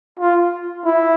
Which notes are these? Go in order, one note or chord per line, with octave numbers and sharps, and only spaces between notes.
F4
E4